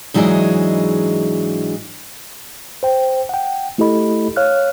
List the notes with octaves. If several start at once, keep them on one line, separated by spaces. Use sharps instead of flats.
G#2 E3 F#3 D4 G#4 D#5
C5 G5
F#5 G5
A3 E4 G4 A4 D#5 B5
C#5 F5 F6 F#6